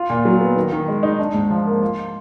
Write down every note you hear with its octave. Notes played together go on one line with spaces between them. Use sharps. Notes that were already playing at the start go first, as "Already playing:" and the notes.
Already playing: F4
A#2
F#3
B3
D#3
D#3
G#3
D#4
D4
G#2
F3
A#3
F4